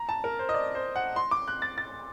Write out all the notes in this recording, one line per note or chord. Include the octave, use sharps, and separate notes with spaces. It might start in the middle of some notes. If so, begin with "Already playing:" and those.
Already playing: A#5
A5
A#4
C5
D#5
D5
C5
F#5
C6
D6
F#6
A6
A6